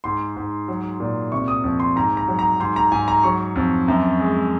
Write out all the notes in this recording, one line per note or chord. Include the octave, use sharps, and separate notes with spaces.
G#2 C6
G#2
F#3
A#2
C3 C#6
D#6
F2
C6
G#2 A#5
A#5
F#3
A#5
G#2 C6
A#5
G#2 G#5
A#5
F#3 C#6
F2
F#2
G#3